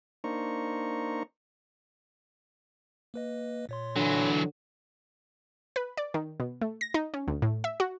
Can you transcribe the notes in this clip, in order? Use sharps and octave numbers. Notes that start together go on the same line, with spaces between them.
A#3 D4 D#4 C5 A#5 C#6
A#3 B4 D#5
A#2 C#5 C6
D3 E3 F#3
B4
D5
D#3
B2
A3
A#6
D#4
C#4
D2
A2
E5
F#4